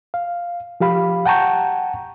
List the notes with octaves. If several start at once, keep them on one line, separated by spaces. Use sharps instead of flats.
F5
F3 G4 F5 B5
F#5 G5 A5 A#5 C#6 G6